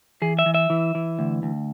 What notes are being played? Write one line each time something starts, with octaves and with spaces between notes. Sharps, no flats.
E3 G#4
E5
E3
E5
E3
E3
D2
D2